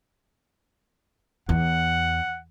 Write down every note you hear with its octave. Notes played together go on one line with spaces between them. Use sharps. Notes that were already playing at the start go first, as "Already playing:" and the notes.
E2 F#5